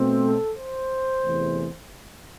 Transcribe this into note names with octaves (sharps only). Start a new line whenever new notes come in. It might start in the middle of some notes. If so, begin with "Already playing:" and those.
Already playing: B2 A3 C4
A4
C5
E2 C3 E3 A3